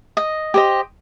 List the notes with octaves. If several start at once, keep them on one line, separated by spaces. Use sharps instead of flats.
D#5
G4 C5 D#5